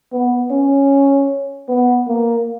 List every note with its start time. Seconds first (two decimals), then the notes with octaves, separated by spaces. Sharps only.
0.12 B3
0.51 C#4
1.68 B3
2.08 A#3